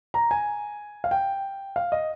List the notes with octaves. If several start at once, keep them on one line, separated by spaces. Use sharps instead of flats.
A#5
G#5
F5
G5
F5
D#5